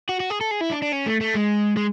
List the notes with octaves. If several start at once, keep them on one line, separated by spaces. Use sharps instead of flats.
F#4
F#4
G#4
A4
G#4
E4
D4
D4
C#4
A3
A3
G#3
G#3